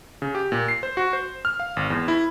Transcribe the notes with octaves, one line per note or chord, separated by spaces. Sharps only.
C#3
G4
A#2
C7
C5
F#4
C5
F6
F5
G#1
E2
E4